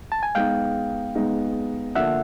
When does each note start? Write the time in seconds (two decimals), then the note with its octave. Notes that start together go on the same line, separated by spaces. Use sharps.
0.12 A5
0.23 G#5
0.35 G#3 B3 D#4 F5 G5
1.15 G#3 B3 D#4
1.95 D3 F3 A#3 D4 E5 F#5